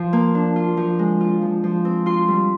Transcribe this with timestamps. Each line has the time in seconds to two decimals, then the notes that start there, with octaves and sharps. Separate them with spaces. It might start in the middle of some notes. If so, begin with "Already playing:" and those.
Already playing: F3 F4 C6
0.13 A#3
0.34 D4
0.56 F4
0.77 F3
0.99 G#3
1.21 F4
1.42 F3
1.64 F3
1.85 C4
2.06 F4 C6
2.28 G3